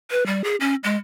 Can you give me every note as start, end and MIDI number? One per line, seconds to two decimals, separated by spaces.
0.11 0.26 71
0.26 0.42 55
0.44 0.56 68
0.61 0.75 61
0.84 0.96 56